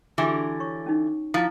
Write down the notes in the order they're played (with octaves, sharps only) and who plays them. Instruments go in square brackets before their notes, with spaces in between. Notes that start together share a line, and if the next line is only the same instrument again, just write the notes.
[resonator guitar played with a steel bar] D3 E3 [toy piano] F#4 G4
[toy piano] C#5 C#6
C#4 D#4
[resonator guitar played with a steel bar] F3 [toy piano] E4 D#5 A#5